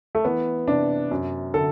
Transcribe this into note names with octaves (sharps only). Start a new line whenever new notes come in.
A3
E3 B3
C3 D4
F#2
D3 A4